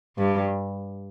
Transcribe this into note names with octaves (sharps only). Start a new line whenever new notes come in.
G2 G3